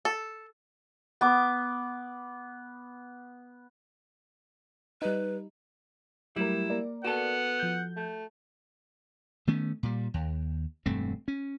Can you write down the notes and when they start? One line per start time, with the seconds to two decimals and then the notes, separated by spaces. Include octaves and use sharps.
0.05 A4
1.21 B3 D6
5.02 G3 D#4 B4
6.36 F#3 G3 A3 E4 A#4
6.70 A#3 A#4 D5
7.04 B3 F#4 A4 F#5
7.59 F3 G6
7.97 A3
9.47 D#3 A3 B3 C#4
9.83 A#2 G3
10.14 D#2
10.86 E1 G2 A3 C4
11.28 C#4